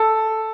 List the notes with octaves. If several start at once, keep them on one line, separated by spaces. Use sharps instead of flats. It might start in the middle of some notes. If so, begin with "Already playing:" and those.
Already playing: A4